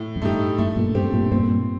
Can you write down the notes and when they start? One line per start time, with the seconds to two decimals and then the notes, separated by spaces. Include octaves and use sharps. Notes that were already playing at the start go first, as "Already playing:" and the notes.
Already playing: A2
0.16 F2
0.22 G2 A3 D#4 G4
0.58 G2 A3
0.76 G2 A#2
0.95 G2 C4 G4
1.13 G2 A#2
1.31 G2 A#2 C4